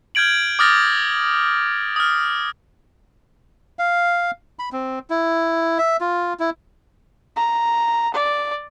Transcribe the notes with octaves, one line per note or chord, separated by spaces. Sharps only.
F6 G6 G#6 D7 F#7
D6 D#6 F6 A6 A#6
D#6 F6
F5
B5
C4
E4
E5
F4
E4
A#5
D5